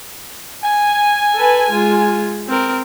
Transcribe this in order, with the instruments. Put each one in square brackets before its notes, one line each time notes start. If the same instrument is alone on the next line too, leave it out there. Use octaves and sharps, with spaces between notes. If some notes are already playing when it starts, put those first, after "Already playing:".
[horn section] G#5
[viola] A4 B4
G#3 F4
C4 A#4